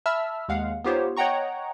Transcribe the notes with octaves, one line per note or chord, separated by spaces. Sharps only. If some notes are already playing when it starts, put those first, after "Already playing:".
E5 A5 B5 E6 F6
D#2 G#3 F5 F#5
B3 D#4 F4 G4 C5 C#5
C#5 D#5 F#5 G5 A#5 C#6